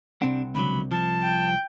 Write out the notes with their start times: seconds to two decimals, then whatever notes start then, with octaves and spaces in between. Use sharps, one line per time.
0.22 C2 C3 C4 D4 F#5
0.55 C#2 D3 F#3 B5
0.91 F3 A5
1.23 G5